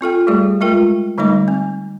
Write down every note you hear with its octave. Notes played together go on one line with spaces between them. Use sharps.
C4 F4 A4 G5
G3 A3 G4 G#4 D5
G#3 A3 F4 A#4 G5
D3 G3 A3 D#4 D#5 D6
C4